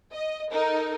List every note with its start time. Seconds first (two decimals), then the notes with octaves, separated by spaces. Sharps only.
0.13 D#5
0.52 D#4 A4 A#4